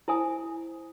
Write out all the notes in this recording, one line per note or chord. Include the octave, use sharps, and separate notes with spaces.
E4 C5 G#5 D#6